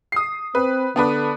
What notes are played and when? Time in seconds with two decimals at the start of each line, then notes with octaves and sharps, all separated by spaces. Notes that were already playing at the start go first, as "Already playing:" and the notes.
0.12 D#6 C7
0.55 C4 B4
0.96 D3 B3 D4 B4